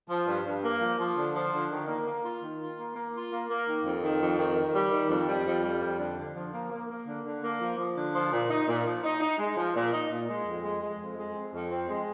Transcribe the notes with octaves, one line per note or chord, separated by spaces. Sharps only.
F3
G2
G2
A#3
F3
F3
D3
F3
D3
D#3
A#3
A#3
F4
D#3
F4
A#3
A#3
F4
A#3
A#3
D#3
F2
D#3
F2
D#3
D#3
G3
D#3
F2
G3
F2
G3
F2
D3
D3
F3
A#3
A#3
A#3
D3
D3
A#3
F3
F3
D3
F3
A#2
D#4
A#2
F3
D#4
D#4
G#3
F3
A#2
D#4
A#2
G#3
F2
G#3
G#3
F2
G#3
C4
F2
C4
G#3